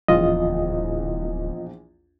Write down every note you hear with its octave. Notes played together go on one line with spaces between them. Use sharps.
D1 A#1 E2 F4 D#5